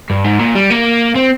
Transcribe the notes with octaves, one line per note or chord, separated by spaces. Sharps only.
G2
G#2
A#2
G3
A#3
C4